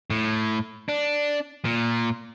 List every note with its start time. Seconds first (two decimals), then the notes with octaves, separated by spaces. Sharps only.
0.10 A2
0.89 D4
1.65 A#2